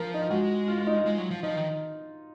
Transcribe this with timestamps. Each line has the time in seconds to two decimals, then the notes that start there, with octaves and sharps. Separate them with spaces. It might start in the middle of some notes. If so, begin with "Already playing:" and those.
Already playing: F3 A#4
0.14 D#4
0.22 F4
0.30 G#3 F#4
0.68 F4
0.78 F4
0.87 D#4
0.96 F4
1.06 G#3
1.18 F#3
1.31 F3
1.43 F3 D#4
1.56 D#3